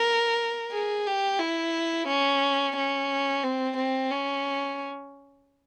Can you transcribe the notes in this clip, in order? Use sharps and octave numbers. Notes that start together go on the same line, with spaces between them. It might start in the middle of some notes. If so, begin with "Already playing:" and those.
Already playing: A#4
G#4
G4
E4
C#4
C#4
C4
C4
C#4